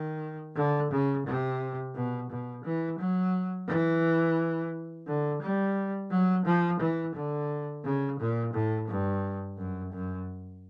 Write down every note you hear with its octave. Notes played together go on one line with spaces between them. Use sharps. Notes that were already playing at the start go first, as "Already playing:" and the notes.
Already playing: D#3
D3
C#3
C3
B2
B2
E3
F#3
E3
D3
G3
F#3
F3
E3
D3
C#3
A#2
A2
G2
F#2
F#2